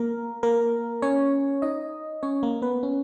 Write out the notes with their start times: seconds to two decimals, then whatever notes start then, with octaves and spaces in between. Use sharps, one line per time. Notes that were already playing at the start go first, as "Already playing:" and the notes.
Already playing: A#3 A#4
0.43 A#3 A#4
1.02 C#4 C#5
1.62 D#4 D#5
2.23 C#4 C#5
2.43 A#3 A#4
2.62 B3 B4
2.83 C#4